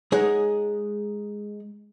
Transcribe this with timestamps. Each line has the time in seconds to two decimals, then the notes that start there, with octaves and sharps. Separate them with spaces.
0.12 G#3 D#4 G#4 C#5 F#5